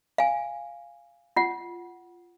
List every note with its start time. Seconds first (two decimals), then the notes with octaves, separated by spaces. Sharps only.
0.18 F5 G#5
1.36 F4 F#5